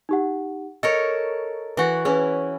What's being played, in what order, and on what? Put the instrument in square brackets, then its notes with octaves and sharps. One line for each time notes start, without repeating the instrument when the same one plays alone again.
[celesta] D#4 G4 F#5
[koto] A4 A#4 C#5 [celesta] D#5
[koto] E3 F#4
[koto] C#4 E4 [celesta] G#4 B4